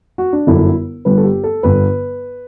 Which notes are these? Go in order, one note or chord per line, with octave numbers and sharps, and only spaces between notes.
F#4
D4
G1 F#2 D3 E4
G1 G2 D3 B4
A4
G4
A4
G1 G2 D3 B4